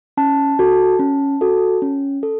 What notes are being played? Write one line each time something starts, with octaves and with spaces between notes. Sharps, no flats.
C#4 A5
F#4 A4
C#4
F#4 A4
C#4
A4